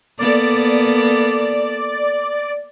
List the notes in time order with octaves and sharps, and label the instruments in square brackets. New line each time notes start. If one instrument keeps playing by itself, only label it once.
[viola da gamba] A#3 B3 A4 [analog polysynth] D5